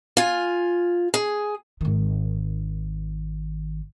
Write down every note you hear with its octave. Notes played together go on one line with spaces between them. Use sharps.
F4 G#5
G#4
G#1 D#3